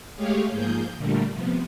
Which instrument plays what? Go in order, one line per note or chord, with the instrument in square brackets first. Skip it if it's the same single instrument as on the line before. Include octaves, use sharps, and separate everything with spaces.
[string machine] G#3 A3 G4 G#4 C#5 F5
G#2 F3 A#3 G#4 G6
A#2 D3 G3 A3 A#3
C3 F3 B3